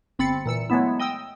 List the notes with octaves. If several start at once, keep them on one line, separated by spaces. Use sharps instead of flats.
G1 C4 B5 A6 C#7
A#2 E3 E6 C#7
F#3 G#3 A3 B3 E4
D#5 G5 D#6 E6